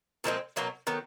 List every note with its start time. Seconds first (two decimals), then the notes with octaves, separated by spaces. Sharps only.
0.24 A#2 F3 G#3 C4
0.56 B2 F#3 A#3 C#4
0.87 D#3 F#3 B3